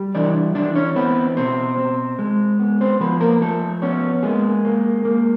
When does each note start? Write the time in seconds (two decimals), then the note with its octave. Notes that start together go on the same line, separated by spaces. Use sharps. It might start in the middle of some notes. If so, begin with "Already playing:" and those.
Already playing: G3
0.15 E3 D4 D5
0.55 E3 D4 D5
0.75 C#4 C#5
0.96 B3 C4 B4
1.37 B2 C4 C5
1.78 C4
2.19 G#3
2.60 B3
2.81 C4 C5
3.01 F3 B3 B4
3.21 A#3 A#4
3.41 F3 A3 A4
3.82 B3 C#4 C#5
4.23 G#3 A#3 G#4
4.65 A#3
5.05 A#3